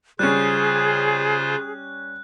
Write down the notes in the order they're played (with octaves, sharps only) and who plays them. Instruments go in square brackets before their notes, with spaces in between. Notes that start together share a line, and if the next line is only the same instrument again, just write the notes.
[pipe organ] C#3 F4 C5 [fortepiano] G3 C#4 [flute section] G#4 [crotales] F#6